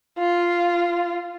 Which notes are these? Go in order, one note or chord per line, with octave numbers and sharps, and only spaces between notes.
F4